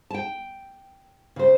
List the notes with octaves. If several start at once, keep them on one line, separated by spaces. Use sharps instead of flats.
G5 A5
C#3 C5